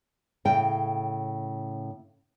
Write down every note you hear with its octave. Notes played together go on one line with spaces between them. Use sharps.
A2 C#3 G5